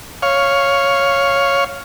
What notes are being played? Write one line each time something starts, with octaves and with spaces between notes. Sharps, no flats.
C#5 F5